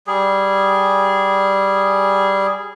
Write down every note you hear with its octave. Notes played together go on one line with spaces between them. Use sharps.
G3 G#4